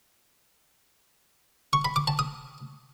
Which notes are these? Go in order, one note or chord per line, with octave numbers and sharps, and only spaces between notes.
C#6
B5
D6
A5
D#6